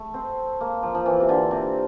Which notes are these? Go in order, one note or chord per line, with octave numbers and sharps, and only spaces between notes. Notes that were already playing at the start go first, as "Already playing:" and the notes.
Already playing: A3
C4
A#3
F3
F3
E3
C3
D3
C3